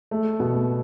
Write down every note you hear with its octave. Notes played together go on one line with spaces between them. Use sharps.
A3
B2